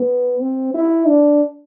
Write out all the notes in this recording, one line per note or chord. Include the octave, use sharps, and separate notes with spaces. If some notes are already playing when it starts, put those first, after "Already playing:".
Already playing: B3
C4
E4
D4